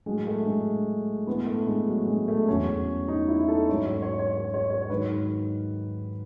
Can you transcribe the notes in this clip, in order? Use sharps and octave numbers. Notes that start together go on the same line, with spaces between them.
A2 F#3 G#3
A3
G#3
A2 E3 B3
A3
G#3
F#3
G#3
A3
E2 C#3 F#3 C#4
D#4
E4
A4
G#2 F#3 C#5
C#5
C#5
C#5
C#5
C#5
C#5
C#5
G#2 D#3 F#3 B4